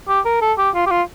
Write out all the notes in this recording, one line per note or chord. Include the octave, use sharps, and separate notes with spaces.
G4
A#4
A4
G4
F4
G4
F4